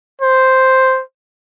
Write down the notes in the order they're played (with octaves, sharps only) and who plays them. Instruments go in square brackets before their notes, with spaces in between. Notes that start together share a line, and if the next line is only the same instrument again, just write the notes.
[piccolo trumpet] C5